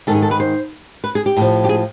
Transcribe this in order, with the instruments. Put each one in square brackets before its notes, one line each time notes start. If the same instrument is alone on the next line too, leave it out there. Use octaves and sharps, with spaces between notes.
[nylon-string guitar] G#2 D#3 A4
G#4
A4
B4
C5
B4
G#4
G4
A2 F3
G4
G#4